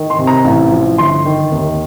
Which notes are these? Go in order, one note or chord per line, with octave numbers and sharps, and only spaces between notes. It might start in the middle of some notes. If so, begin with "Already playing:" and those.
Already playing: D#3
C6
C3
A#5
A1
F3
G1 C6
D#3
D#2